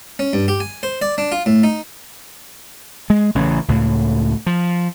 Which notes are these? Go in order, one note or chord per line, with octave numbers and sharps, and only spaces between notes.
C#4
G2
G4
G#5
C5
D5
D4
F4
A2
D#4
G#3
A1 C#3 E3 C#4
C#2 A2
F3